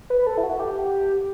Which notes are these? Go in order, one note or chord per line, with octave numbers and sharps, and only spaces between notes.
B4
A4
E4
F#4
G4